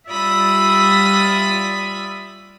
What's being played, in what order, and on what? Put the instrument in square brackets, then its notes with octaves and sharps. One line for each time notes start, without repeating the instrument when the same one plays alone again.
[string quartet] G3 F4 D5 E5 B5 D#6